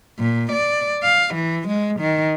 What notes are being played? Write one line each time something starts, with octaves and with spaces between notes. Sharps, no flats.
A#2
D5
F5
E3
G#3
D#3